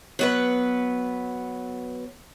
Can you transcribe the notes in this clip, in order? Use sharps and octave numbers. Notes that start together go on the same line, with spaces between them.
F#3 B3 B4